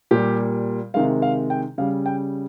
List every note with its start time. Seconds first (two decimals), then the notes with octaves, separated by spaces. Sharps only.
0.11 A#2 G3 G4
0.94 C3 D#3 G#3 F5
1.22 F5
1.50 G5
1.78 C#3 G3 F5
2.06 G5